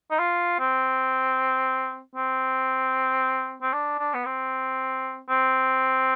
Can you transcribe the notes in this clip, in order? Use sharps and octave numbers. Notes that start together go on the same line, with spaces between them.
D#4
F4
C4
C4
C4
D4
D4
B3
C4
C4